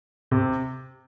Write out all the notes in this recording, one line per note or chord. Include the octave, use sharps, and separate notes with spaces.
C3